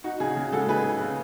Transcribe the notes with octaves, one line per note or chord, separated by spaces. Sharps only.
D#4 F#4
C#3 G#4
C#3
G#3 F#4 A4
D#4 G#4 B4
C#3
C#3